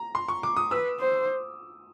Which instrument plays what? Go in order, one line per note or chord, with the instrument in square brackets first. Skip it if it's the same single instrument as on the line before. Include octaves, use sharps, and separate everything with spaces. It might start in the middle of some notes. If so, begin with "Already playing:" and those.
Already playing: [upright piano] A#5
C6
C#6
D6
D#6
[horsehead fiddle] B4 [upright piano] E6
[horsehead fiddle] C5